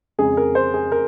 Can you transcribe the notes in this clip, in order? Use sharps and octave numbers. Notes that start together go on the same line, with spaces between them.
F2 C#3 G#3 C#4 G#4
A#4
C5
G#4
A#4